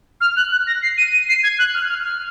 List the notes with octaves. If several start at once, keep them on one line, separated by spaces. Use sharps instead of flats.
F6
F#6
F#6
A#6
C7
D#7
D#7
C7
G#6
F#6
F6
F6
F6